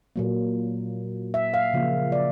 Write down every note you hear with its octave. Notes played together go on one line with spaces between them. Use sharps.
A#2 F#3 A#3
E5
F5
C#3 F3 A#3
D5